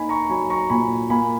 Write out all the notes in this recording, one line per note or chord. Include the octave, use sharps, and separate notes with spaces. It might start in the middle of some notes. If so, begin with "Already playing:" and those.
Already playing: A#3 D#4 G#5 B5
A#5 C#6
F#3 G#5 B5
A#5 C#6
A#2 G#5 B5
A#3 G#5 B5